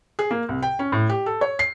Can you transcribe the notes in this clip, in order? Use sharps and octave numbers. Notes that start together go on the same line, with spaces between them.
G#4
A#3
C2
G5
C#4
A2
G4
A4
C#5
C7